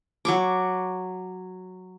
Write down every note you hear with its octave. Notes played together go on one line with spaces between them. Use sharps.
F#3 C#6 D6